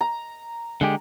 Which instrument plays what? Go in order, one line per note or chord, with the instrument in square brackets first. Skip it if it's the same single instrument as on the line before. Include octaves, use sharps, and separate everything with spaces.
[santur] A#5
[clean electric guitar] D3 G#3 G4